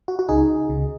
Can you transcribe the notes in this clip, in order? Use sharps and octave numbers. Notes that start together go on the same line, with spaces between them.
F#4
F#4
C#2 C#3 D#4 G#4
C#2 C#3